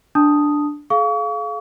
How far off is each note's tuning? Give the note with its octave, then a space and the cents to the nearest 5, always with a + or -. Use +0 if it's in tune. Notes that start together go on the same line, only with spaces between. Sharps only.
D4 +0 A5 +0 D#6 +0
G#4 +45 F5 +0 C#6 +40